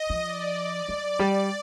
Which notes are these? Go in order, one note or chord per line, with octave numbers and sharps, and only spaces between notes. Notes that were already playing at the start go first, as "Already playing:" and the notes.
Already playing: D#5
F3
D5
F#3
G3